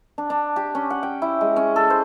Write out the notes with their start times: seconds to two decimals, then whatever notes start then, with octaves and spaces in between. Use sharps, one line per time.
0.18 D4
0.30 D4
0.56 G4
0.75 C#4
0.90 F#5
1.03 G5
1.22 E4
1.41 G#3
1.56 C#4
1.76 A4
1.90 C5